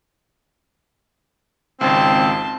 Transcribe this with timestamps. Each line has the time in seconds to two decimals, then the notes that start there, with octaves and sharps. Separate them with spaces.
1.81 G#1 C#2 C4 A5 C6